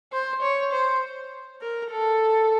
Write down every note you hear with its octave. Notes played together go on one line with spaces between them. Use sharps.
C5
C#5
C5
A#4
A4